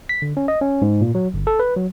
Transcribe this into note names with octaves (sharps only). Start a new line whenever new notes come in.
B6
D3
C#4
D#5
C#4
G#2
A#2
F#3
G1
A4
B4
F#3